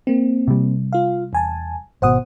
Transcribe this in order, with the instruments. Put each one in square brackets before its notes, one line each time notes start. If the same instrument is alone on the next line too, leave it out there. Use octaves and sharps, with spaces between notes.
[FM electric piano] A#3 C4
[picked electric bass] C3 G3
[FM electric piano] F4 F5
E2 G#5 A5
[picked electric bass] G#1 B2 [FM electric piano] C5 F#5 D#6